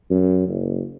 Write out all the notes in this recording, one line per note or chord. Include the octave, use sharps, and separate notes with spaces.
F#2
F#1